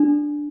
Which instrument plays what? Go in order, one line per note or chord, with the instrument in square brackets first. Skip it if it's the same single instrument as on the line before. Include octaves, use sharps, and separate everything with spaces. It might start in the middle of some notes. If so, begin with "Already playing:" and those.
Already playing: [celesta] D4